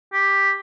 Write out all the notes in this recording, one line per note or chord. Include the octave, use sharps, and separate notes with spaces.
G4